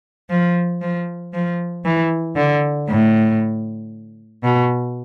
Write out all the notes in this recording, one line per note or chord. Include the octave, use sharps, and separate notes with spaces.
F3
F3
F3
E3
D3
A2
B2